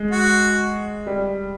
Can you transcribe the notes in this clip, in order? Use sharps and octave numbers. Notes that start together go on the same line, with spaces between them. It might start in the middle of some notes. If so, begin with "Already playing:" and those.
Already playing: G#3
F#4
G3